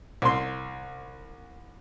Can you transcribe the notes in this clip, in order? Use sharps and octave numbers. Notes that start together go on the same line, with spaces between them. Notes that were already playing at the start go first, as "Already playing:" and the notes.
C2 C6